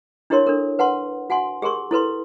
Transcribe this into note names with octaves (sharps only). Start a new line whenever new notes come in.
D4 E4 G4 A#4 C#5 C6
D4 A4 A#4
B4 F#5 A5 C6
F#4 F#5 G#5 C6
G4 G#4 A#4 C6 C#6
E4 A4 B4 C6